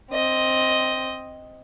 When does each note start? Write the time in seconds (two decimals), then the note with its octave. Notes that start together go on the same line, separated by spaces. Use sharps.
0.12 C4 D#5